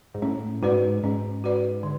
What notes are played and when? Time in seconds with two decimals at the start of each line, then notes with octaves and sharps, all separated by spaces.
0.14 G#2
0.22 A2 C#4
0.63 G#2 F#4 B4 D5
1.03 G#2 C#4
1.44 F#4 B4 D5
1.83 D3